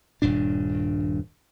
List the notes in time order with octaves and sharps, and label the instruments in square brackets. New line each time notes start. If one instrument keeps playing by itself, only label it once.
[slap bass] D#1 G2 A#2 D4